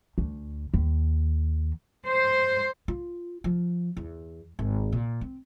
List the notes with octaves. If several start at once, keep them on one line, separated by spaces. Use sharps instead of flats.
D2
D#2
C5
F4
F3
E2
G#1
A#2
C4